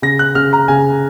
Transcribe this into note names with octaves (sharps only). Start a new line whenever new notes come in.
C#3 A#6
F#6
C#3 F6
A#5
C#3 G#5